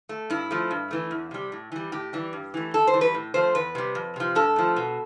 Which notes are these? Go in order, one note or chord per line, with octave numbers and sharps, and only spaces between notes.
A3
G2 E4
F3 A3
G2
E3 A3
E2
C3 G3
A2
E3 G3
A2 G4
E3 G3
G2
E3 A3
G2 A4
C5
E3 G3
B4
A2
F3 A3 C5
E2 B4
C3 G3
F2
C3 F3
G2 A4
F3 A3
B2